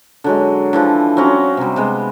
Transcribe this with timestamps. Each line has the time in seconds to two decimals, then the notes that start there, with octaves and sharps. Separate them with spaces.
0.24 D3 F#3 G#3
0.73 D3 E3 F3
1.17 F#3 C4 C#4 A#5
1.57 C3 G3
1.76 C3 G#3 B3